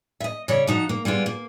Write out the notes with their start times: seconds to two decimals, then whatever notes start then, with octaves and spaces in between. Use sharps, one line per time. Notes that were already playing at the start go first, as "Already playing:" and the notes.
0.20 D#5 E5
0.48 C#3 G3 C#5
0.67 F3 D#4 F#4
0.89 A#3
1.05 G3 G#3 B3 F4
1.26 A#3